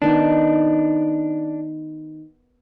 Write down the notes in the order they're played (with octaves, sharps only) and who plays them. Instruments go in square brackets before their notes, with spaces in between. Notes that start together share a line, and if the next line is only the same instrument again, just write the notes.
[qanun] D#3 B3 D#4 [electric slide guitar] D4